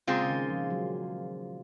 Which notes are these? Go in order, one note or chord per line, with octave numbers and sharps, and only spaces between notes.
A#2 C#3 G#3 C4 F4 G#4
C#3
D#3
F3
F#3